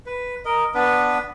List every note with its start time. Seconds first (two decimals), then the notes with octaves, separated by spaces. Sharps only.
0.06 B4
0.45 A#4 D#5
0.74 B3 D4 B4